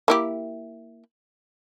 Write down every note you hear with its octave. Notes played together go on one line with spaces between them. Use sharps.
A#3 E4 G4